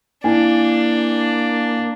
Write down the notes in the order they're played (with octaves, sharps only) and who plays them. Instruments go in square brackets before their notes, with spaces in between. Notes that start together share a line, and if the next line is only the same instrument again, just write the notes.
[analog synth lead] A#3 [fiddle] D4 [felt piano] E4 G#5